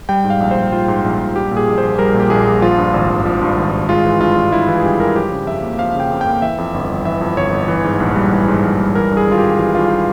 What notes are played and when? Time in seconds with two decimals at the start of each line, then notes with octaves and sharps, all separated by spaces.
0.09 G3 G5
0.24 G#2
0.30 F5
0.40 A#1
0.51 C5
0.57 A#1
0.72 G3 F4
0.88 G#2
1.04 A#1
1.20 A#1
1.36 G3 G4
1.51 A#2
1.57 G#4
1.68 A#1
1.78 C5
1.83 A#1
1.99 G3 A#4
2.14 A#2
2.20 G4
2.30 A#1 G#4
2.47 A#1
2.62 F3 F4
2.78 G2
2.94 G#1
3.10 G#1
3.25 F3
3.41 G2
3.57 G#1
3.73 G#1
3.88 G#3 F4
4.05 E3
4.20 G2 F4
4.36 G2
4.52 G#3 E4
4.67 E3 F4
4.78 G#4
4.83 G2 G4
4.99 G2 A#4
5.15 F3 G4
5.31 C#3
5.47 F2 E5
5.62 A#3
5.79 F3 F5
5.95 C#3 G5
6.11 F2
6.21 A#3 G5
6.42 E3 E5
6.58 F2
6.74 G1
6.89 G1
7.05 E3 E5
7.21 F2
7.37 G1 C#5
7.52 G1
7.68 E3
7.84 G#2
8.00 A#1
8.16 G3
8.32 E3
8.48 G#2
8.63 A#1
8.80 G3
8.95 E3 A#4
9.11 G2
9.17 G#4
9.27 G#1 F4
9.38 G#1 G4
9.59 E3 G4
9.74 G2 F4
9.90 G4